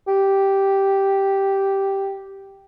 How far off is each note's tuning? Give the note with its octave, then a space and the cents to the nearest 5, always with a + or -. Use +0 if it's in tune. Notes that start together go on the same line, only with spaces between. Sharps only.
G4 -5